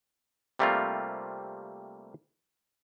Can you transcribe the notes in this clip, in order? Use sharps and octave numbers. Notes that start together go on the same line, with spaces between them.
C3 G3 A3 A#3 C4 F4